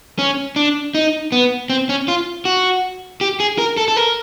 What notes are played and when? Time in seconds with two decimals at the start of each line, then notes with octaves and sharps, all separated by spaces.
0.19 C#4
0.56 D4
0.95 D#4
1.32 B3
1.70 C4
1.89 C#4
2.08 F4
2.45 F#4
3.21 G4
3.40 G#4
3.58 A#4
3.77 A4
3.88 A4
3.96 A#4